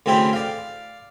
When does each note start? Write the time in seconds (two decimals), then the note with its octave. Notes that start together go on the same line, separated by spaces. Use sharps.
0.06 D2 C#3 C4 E4 G5 B5
0.33 D5 F5